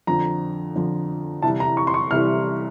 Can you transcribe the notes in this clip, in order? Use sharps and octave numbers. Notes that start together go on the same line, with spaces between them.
F2 D3 F3 A#5
F2 D3 F3
C2 C3 E3 G3 A5
A#5
C#6
C6
C#6
C2 C3 E3 G3 F6